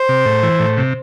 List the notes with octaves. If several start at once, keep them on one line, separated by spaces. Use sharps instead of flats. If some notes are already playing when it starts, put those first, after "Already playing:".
Already playing: C5
C3
A2
E3
A2
C3